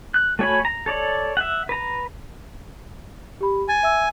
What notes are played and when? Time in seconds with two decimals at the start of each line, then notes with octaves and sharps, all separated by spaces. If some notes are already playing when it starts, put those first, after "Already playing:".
0.14 F#6
0.39 A3 F#4 C#5 G#5 B5
0.65 A#5
0.86 A4 C#5 D5
1.37 E5 F#5
1.69 B4 A#5
3.41 G4 B5
3.69 G#5 A6
3.83 E5 E6